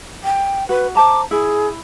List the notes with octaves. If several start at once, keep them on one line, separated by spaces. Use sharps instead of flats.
G5
F#4 B4
C5 A5 A#5 D6
E4 G#4